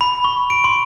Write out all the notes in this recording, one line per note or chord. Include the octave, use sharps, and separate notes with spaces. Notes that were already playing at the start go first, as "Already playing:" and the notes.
B5
C#6
D7
C6